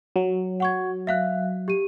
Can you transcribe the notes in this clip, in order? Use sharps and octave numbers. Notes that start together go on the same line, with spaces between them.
F#3
F#5 C#6 G#6
E5 F5 F#6
G4 D#7